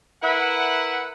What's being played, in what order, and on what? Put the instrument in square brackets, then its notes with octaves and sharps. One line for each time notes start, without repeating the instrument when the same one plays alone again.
[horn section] E4 A#4 B4 E5 F#5